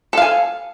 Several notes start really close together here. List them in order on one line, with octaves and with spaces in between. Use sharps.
A4 F5 G#5